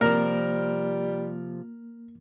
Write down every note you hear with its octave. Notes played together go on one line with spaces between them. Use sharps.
C3 F3 G3 A#3 A#4